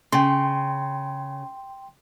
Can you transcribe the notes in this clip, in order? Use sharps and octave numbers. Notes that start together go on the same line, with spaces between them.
C#3 G5 C6